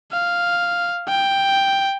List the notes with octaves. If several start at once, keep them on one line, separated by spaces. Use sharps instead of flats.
F5
G5